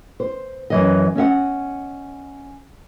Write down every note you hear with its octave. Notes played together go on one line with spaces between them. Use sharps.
C5
F#2 E3 D#5
C#4 D#5 E5 F#5